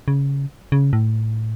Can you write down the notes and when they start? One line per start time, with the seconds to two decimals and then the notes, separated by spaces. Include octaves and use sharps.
0.08 C#3
0.72 C#3
0.93 A2